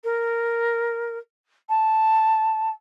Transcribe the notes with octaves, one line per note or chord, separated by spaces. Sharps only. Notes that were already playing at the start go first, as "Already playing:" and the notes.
A#4
A5